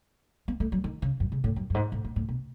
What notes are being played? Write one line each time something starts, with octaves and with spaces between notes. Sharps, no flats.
B3
A3
F#3
D#3
C#3
F#2
C#3
A2
F#2
F#2
G#2
A2
A2
A2
B2